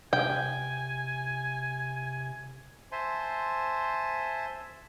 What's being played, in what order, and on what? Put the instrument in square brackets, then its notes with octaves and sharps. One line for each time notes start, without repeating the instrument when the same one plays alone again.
[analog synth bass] C3 [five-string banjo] G5 [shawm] G#5
[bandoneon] C5 E5 G#5 A5 C6